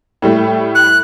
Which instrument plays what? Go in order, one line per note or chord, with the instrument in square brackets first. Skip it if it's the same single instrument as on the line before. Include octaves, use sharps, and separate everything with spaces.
[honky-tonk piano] A2 G3 A3
[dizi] F#6